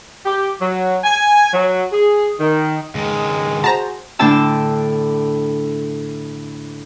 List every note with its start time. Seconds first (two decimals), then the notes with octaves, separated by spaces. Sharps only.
0.24 G4
0.60 F#3
1.04 G#5
1.53 F#3
1.92 G#4
2.39 D#3
2.95 C#2 D#3 G#3
3.64 F#4 G#4 C5 A5 A#5
4.19 A2 D3 D4 G5 A5 E6